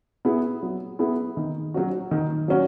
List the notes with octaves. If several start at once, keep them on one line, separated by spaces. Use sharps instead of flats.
B3 E4 G#4
F#3
B3 E4 G#4
D#3
F#3 C#4 F#4
D#3
F#3 C#4 F#4